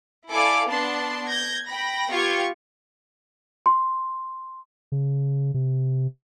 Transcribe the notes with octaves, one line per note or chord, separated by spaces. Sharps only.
E4 A4 D5 F5 G#5 D6
B3 D4 A5 C6
G6 G#6 A#6
G5 B5 A#6
B3 F4 G4 C#6 G#6
C6
C#3
C3